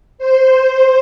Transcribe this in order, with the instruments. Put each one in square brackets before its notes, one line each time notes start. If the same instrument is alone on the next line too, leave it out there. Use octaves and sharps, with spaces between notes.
[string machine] C5